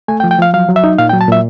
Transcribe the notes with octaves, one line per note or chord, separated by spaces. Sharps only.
A3 G#5
G5
F3
G5
F3 F5
F#3 F5
F#3
E5
D#4
A#2 F5
G5
F#3
A5
A#2 E5